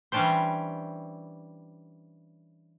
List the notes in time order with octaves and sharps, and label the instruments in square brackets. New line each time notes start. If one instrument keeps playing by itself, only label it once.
[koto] E3 G3 C#4 D4 G4 C5